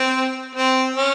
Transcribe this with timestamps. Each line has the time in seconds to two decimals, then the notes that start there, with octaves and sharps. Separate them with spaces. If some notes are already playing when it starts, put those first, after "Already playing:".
Already playing: C4
0.55 C4
0.96 C#4